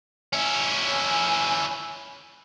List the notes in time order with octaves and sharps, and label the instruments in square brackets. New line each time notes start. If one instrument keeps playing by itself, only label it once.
[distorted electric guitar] C#4 E4